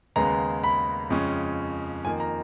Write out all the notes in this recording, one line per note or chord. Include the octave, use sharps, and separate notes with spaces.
D#2 C#3 G#3 B3 A#5
B5
F2 C#3 G#3 C#4
F2 D#3 A#3 G#5
A#5